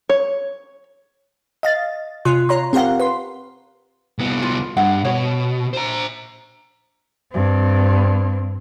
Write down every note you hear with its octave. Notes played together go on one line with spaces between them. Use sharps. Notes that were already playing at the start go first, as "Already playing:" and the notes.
C#5
D#5 F5 A6
C3 F4 C6 F#6
F4 C#5 A#5 C6
C4 G4 A#4 F5 F#5
B4 C6
C2 B3
F4
G2 F#5
B2 C#5
C5 A#5
G2 C4